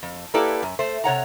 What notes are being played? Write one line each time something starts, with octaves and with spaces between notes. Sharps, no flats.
F2
A#3 E4 G4 A4 B4 D5
F#2
A3 C5
C3 C#5 F#5 A#5